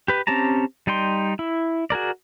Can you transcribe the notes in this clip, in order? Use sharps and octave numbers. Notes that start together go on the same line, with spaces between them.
G4 B4
C4 C#4 G4 A5 A#5
G3 D#4 G5 C6
E4
F#4 G#4 A#4 D5